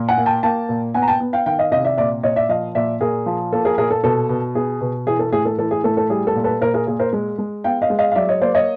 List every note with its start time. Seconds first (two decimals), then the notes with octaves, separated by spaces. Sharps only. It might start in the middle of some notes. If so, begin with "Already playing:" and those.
Already playing: A#2
0.09 F#5 G#5
0.18 A#3
0.26 G5 A5
0.43 A#3 G5 A5
0.69 A#2
0.94 B3 F#5 G#5
1.02 A#5
1.08 G5 A5
1.20 B3
1.33 F5 G5
1.46 D#3 F5 G5
1.59 D#5 F5
1.72 C3 D#5 F5
1.85 D5 E5
1.97 A#2 D5 E5
2.23 A#2 C#5 D#5
2.36 D5 E5
2.49 F3 D#5 F5
2.75 A#2 D5 E5
3.01 A#2 G#4 A#4
3.26 F3
3.53 A#3 A4
3.65 G#4 A#4
3.78 A#2 G#4 A#4
3.91 A4
4.04 B2 A4
4.29 B2
4.55 B3 G#4
4.81 B2
5.07 E3 G#4
5.19 A4
5.32 A2 G#4
5.45 A4
5.58 E3 A4
5.71 G#4
5.84 A2 A4
5.97 A4
6.10 G3 G#4
6.27 A4
6.35 A#2
6.44 A4 B4
6.61 A#2 A#4 C5
6.74 G#4 A#4
6.87 A#2 G#4
6.99 A#4 C5
7.13 G#3
7.38 G#3
7.64 B3 F5 G5
7.82 D#5 F5
7.90 G#3
7.99 D#5 F5
8.12 F5
8.15 F#3 D5 E5
8.29 C#5 D#5
8.42 A#3 C5 D5
8.55 C#5 D#5